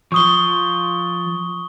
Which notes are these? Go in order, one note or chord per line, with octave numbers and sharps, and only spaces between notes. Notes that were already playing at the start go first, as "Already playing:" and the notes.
F3 C#6 D#6 G7